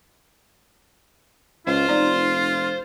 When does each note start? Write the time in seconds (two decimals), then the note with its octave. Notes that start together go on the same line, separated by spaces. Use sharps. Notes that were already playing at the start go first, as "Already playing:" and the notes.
1.67 C#2 F4 C5
1.89 F1 D#4 D5